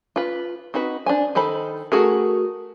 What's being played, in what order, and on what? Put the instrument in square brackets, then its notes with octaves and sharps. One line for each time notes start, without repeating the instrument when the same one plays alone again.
[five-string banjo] F4 B4
C4 D#4 F#4 B4
D4 C5 G#5
D#3 D#4 A4 C5 B5
A3 F#4 G#4 A#4